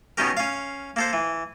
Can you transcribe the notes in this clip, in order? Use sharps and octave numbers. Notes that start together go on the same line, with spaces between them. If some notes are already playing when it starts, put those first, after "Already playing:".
B2 D#3 C#4 G4 A#4
C#4 F5
A#3 A4 C5
E3